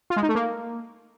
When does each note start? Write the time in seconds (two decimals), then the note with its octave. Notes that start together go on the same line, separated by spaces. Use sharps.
0.10 F4
0.16 G#3
0.23 D#4
0.29 A3
0.35 A#3